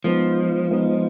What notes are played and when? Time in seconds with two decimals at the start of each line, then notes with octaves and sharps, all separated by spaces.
0.04 F3 G#3 B3 D#4
0.70 G#3 B3 D#4